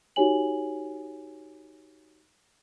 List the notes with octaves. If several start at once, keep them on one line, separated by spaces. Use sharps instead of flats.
D#4 F#4 G4 C#5 G#5 F#7